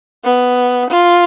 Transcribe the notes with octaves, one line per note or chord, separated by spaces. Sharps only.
B3
F4